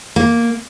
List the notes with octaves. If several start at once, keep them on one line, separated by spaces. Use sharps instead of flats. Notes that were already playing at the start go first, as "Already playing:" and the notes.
A#3